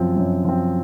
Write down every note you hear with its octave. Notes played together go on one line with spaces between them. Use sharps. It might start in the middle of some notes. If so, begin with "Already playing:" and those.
Already playing: F#2 F3 C4
F#2
F3 C4